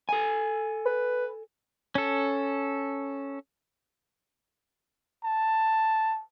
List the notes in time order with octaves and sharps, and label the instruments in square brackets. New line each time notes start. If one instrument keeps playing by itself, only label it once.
[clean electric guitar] A4 G#5
[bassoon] B4
[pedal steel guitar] C#4 A4
[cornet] A5